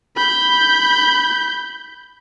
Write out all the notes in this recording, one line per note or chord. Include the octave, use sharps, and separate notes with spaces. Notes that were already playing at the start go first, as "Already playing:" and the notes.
B5 G6